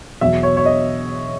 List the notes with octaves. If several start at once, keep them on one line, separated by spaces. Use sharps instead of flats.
E1 E2 B2 F#3 E5
C#5
C#5
D#5